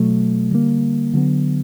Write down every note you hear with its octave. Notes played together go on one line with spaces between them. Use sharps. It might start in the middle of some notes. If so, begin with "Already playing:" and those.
Already playing: B2 F#3 A3
D3 G3 A#3
D3 F#3 B3